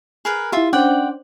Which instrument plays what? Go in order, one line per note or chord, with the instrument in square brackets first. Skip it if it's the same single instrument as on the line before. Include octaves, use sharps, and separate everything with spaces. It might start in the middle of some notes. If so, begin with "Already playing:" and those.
[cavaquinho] G#4 A#4 B4
[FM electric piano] E4 G4 [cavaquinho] F4 E5
[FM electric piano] C#4 D4 C5 [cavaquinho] D5 F#5 G5